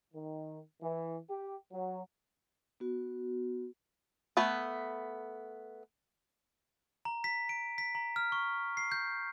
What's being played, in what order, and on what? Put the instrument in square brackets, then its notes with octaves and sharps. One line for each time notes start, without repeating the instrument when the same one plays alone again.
[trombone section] D#3
E3
G4
F#3
[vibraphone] B3 F#4
[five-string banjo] A3 B3 B4
[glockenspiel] A#5
B6
D7
B6
A#5
F6
C#6
C7
G6